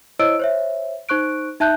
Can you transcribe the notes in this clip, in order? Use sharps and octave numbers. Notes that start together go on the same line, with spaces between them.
E4 C5 C#5 D#5 E6 D7
C5 C#5 E5
D#4 C5 C#6 F#6 D7
D#4 E5 A5 F#6 G6